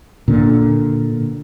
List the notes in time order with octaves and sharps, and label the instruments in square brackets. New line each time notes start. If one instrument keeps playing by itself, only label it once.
[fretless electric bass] A#2 D3